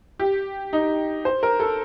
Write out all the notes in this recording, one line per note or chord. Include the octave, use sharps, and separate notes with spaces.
G4
D#4
C5
A#4
A4